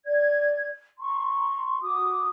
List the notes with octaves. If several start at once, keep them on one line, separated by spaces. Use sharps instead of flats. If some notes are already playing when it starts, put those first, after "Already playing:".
D5 G#6
A#5 C6 C#6
F#4 D6 D#6